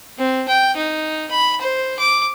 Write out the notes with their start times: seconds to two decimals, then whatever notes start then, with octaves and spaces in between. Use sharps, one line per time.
0.19 C4
0.48 G5
0.77 D#4
1.31 B5
1.61 C5
1.99 D6